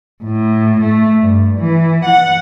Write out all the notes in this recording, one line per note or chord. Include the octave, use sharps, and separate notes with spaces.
A2
A3
G2
E3
F#5